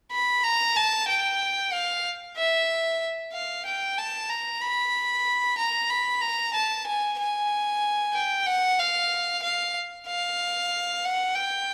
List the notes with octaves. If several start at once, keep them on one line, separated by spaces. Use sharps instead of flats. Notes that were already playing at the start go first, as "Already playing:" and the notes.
B5
A#5
A5
G5
F5
E5
F5
G5
A5
A#5
B5
A#5
B5
A#5
A5
G#5
G#5
G5
F#5
F5
F5
F5
F#5
G5